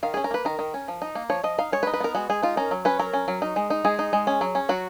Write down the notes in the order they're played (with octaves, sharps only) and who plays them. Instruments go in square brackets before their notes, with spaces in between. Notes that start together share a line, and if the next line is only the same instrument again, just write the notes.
[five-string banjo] D#3 F5
C#4 G#4
A#4
A#3 B4
D#3 A#4
D#3
C#4
F3
D#4
A#3
F3 C#5
F3 D#5
D#4 F5
G#3 C#5
B4
D#4
B4
B3 A#4
G#3 F#4
G#3 G#4
D#4 F4
C#4 A#4
F#3
C#4 B4
F#3 A#4
C#4
F#3
D#4
G#3
D#4
G#3 G#4
D#4
G#3
C#4
F#3
C#4
F#3 F#4